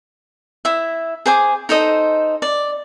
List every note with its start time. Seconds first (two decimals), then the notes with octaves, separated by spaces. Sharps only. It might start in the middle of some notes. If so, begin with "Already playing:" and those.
0.65 E4 E5
1.26 G#4 C5 G#5 D6
1.69 D#4 A4 C5 D#5
2.42 D5